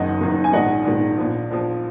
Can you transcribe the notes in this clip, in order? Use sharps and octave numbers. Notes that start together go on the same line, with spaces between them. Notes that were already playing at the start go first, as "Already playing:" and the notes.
Already playing: F#1 F#2 D#3 D#5 F#5
F#1 F#2 D#3
G#5
A#1 G#2 D#3 D#5 F#5
A#1 G#2 D#3
A#1 A#2 F3
A#1 A#2 F3